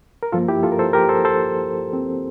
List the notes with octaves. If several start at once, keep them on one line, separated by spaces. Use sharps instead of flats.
A#4
G2 F3 A#3 F4 A4
E4 G4
F4 A4
A#4
A4 C5
G4 A#4
A4 C5
A4 C5
C4